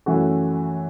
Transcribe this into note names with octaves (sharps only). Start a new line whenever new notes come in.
F#2 E3 A3 F#4